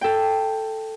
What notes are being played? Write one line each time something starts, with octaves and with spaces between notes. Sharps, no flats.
A4 G5